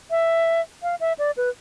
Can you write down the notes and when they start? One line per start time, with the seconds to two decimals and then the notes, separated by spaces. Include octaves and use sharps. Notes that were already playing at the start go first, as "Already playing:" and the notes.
0.11 E5
0.83 F5
1.00 E5
1.18 D5
1.37 B4